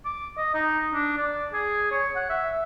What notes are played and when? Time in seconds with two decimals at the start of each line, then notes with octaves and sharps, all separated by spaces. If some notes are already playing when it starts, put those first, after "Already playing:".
0.05 D6
0.37 D#5
0.54 D#4
0.94 D4
1.18 D5
1.53 G#4
1.92 C#5
2.16 F#5
2.30 E5